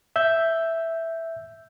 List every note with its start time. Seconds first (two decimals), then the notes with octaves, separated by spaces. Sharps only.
0.16 E5 E6 G6